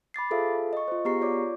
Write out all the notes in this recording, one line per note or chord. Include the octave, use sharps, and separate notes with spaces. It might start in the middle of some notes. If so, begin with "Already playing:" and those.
B5 D6 A6 C7
F4 G#4 A4 C5 E5 F5
D#5 C#6
F4 C5
B3 G4 G#4 A#5 C#6 C7
F4 C#5 D5 D6